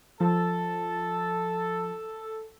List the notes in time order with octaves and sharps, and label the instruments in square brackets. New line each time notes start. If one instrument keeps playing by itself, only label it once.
[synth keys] F3 [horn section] A4 [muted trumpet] A5